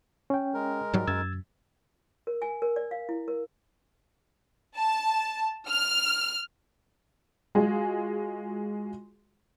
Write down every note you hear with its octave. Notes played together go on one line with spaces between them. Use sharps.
C#4 G5
G#3 A#4
G#2 F#3 G3
F#2 E6 G#6 A6
A#4
G#5
A#4
D5
F5
E4
A#4
A5
F6
G#3 F4 F#4 G#4